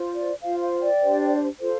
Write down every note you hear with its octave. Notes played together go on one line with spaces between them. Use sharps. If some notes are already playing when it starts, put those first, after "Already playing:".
Already playing: F4 C5
D5
F4 C5 F5
F5
D5 G5
D4 G4 C5
F4 A4 C5